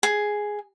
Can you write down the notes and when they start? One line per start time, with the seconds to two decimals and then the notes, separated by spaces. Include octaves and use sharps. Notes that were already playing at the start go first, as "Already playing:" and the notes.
0.03 G#4